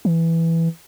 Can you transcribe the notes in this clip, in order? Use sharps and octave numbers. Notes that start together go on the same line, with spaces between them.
E3